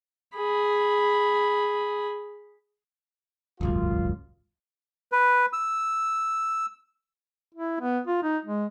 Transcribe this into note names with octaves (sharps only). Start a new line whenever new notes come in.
G#4 B5
D#1 G#1 C#2 F#2 F4
B4
E6
E4
B3
F4
D#4
G#3